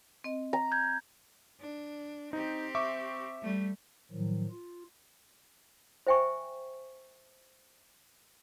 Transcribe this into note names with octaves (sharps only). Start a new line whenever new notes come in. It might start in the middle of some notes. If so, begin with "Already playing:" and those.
C4 D#5
A#5
G6 G#6
D4
C4 D#4 G4
E5 C#6 D6
G3 A3
A2 D#3 F3 F#3
F4
C5 E5 G5 G#5 C#6